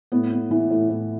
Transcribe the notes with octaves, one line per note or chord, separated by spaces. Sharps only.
A2 B3
B3
E3
A2
A2